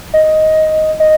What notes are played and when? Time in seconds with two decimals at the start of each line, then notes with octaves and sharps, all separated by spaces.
0.14 D#5
1.00 D#5